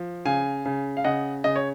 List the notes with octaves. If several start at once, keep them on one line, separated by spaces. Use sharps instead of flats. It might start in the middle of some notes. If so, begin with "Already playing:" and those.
Already playing: F3
C#3 F5 G#5
C#3
F5
C#3 D#5 F#5
C#3 D#5
C#5